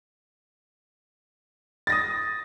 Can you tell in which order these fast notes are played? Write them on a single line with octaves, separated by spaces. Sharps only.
A6 A#6 D#6